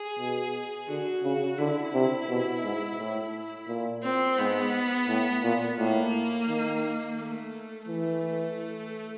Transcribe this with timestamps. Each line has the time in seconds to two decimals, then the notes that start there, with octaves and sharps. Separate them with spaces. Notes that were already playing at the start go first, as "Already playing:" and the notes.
Already playing: G#4
0.19 B2
0.88 D3 F#4
1.23 C#3
1.58 D3 E4
1.94 C3
2.29 B2
2.63 G#2
2.99 A2
3.68 A#2
4.03 C4
4.38 G#2 B3
5.08 A2
5.43 A#2
5.78 A2 A#3
6.48 D#3
7.18 A3
7.88 E3 A3